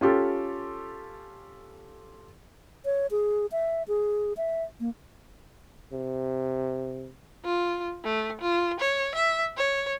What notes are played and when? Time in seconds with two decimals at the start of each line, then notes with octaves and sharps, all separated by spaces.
0.01 C#4 F4 G4 A4
2.85 C#5
3.11 G#4
3.52 E5
3.88 G#4
4.37 E5
4.80 A#3
5.93 C3
7.45 F4
8.04 A3
8.41 F4
8.80 C#5
9.15 E5
9.57 C#5